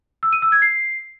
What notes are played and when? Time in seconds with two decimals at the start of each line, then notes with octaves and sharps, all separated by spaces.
0.23 E6
0.32 D#7
0.42 E6
0.52 G#6
0.62 C7